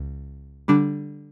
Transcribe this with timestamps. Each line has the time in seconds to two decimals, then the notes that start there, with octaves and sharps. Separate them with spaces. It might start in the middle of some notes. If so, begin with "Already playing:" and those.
Already playing: C#2
0.68 D3 G3 D4